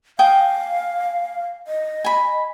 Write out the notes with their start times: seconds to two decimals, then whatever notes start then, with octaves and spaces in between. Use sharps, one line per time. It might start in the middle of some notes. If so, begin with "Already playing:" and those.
0.19 F5 G5 G#5 D#6
1.67 D#5
2.04 G#5 B5